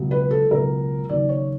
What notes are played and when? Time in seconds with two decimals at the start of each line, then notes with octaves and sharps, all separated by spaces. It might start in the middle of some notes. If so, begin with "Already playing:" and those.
Already playing: C#2 B2 F#3
0.11 B4
0.31 A4
0.51 C#2 B2 F#3 A#4
1.10 D#2 C#3 F#3 D5
1.29 C#5